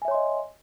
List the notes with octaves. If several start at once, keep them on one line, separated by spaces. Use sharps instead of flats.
C#5 D#5 E5 G#5 C6